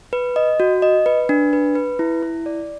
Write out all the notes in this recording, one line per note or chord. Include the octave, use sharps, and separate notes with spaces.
B4
D#5
F#4
D#5
B4
D4
B4
B4
E4
E4
D5